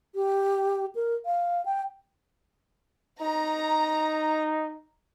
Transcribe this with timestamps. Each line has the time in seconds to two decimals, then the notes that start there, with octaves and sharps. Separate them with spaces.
0.15 G4
0.95 A#4
1.26 F5
1.66 G5
3.22 D#4 A#5